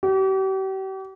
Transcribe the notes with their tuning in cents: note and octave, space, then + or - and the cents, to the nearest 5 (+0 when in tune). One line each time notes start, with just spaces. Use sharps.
G4 -40